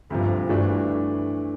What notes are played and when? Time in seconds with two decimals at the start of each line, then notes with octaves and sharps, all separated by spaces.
0.10 D2 G2 C3 F3
0.49 G2 E3 A3 D4 F#4